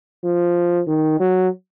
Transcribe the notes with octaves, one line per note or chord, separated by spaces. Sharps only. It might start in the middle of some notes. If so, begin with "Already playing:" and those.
F3
D#3
F#3